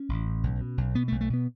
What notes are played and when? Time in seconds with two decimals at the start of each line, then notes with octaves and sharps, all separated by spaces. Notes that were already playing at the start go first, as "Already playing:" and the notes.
Already playing: C#4
0.09 A1
0.26 A2
0.43 B1
0.61 B2
0.78 B1
0.95 B2 B3
1.08 B1 A3
1.21 A3
1.30 B2 B3